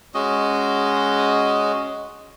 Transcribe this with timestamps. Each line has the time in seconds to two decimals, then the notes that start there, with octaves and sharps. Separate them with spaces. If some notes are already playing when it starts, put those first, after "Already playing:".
0.14 G#3 C#4 F#4 D#5